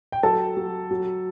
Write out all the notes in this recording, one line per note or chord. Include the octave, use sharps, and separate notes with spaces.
G5
F#3 A4 A5
F#3
F#3